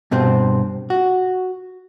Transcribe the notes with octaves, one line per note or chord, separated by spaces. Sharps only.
G2 B2 C4 C5
F#4